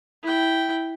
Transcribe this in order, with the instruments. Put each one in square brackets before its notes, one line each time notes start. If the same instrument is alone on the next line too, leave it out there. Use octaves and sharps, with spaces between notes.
[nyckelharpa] E4 G5